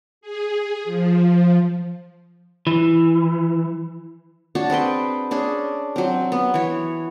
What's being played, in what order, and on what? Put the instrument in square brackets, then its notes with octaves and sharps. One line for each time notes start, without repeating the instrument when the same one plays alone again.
[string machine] G#4
F3
[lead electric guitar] E3
[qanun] D4 F#4 C#5 A5
C4 G#4 B4 G5
C#4 D4 G#4
F#3 C4
B3
E3 C#5